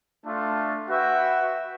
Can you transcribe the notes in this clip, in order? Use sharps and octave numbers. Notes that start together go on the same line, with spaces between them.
A3 D4 F4 A4
F#4 B4 E5 G5